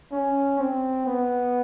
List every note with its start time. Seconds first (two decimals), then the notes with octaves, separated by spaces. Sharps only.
0.12 C#4
0.59 C4
1.06 B3